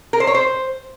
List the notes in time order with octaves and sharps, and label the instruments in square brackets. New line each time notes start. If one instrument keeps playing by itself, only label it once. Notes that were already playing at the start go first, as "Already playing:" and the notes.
[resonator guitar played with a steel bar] A#4
C5
C#5
C5